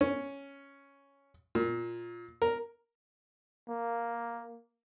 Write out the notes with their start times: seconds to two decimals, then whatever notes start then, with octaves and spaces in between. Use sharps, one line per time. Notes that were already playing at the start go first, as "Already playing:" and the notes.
0.01 C#4
1.55 A#2
2.42 A#4
3.69 A#3